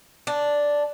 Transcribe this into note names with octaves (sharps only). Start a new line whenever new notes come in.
D4